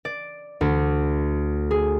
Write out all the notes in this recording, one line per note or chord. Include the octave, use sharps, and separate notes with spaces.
D5
D2
G#4